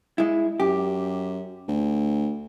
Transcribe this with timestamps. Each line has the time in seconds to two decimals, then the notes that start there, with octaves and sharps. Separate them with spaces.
0.18 G#3 E4
0.60 F#2 G4
1.68 D2